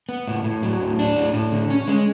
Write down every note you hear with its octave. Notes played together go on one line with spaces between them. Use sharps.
B3
A2
A2
F#3
A2
D4
A2
A2
D3
C#4
G#3